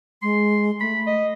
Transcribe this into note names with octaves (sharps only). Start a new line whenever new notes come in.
G#3 C6
A3 B5
D#5